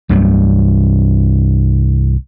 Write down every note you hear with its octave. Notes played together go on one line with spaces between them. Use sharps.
C2 G2 C3 F#3